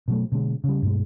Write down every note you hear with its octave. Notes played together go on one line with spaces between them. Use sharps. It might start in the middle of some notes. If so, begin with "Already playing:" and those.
B2 F#3 A3
B2 D3 G#3
C#3 G3
G2 B2 G#3